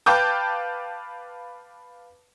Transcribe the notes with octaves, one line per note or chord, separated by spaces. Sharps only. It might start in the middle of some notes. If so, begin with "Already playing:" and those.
B4 F5 G5 A5 D6 G6